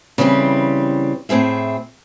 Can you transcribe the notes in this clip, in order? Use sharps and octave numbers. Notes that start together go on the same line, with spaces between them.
C#3 E3 G3 C4
A2 C4 G#4 E5